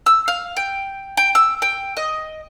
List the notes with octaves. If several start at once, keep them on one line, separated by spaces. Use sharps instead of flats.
E6
F5
G5
G5
E6
G5
D#5